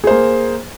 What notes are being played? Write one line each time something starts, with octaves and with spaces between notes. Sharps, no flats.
A#3 G#4 C5